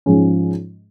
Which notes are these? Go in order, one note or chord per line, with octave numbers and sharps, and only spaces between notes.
G#2 F3 G#3 C#4